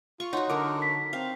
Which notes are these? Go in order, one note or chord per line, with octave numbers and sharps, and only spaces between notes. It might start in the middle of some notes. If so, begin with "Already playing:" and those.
F4 C#6
D#4 F#4 C#5 F#5 C6
D3 F#3 A#4 D6
B6
C4 F5